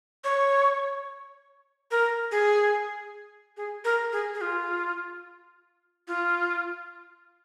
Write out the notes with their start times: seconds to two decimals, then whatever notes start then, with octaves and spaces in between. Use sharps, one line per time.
0.24 C#5
1.91 A#4
2.32 G#4
3.57 G#4
3.84 A#4
4.13 G#4
4.34 G#4
4.41 F4
6.08 F4